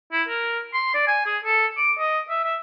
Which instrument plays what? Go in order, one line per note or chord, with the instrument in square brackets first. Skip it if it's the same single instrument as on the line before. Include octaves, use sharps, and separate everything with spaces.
[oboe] E4
A#4
C6
D5
G#5
G#4
A4
D6
D#5
E5
E5